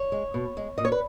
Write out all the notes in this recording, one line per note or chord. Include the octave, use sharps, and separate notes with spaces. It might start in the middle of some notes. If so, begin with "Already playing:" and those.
Already playing: C#5
G#3
B2
G#3
A#2 D#5
C#5
B4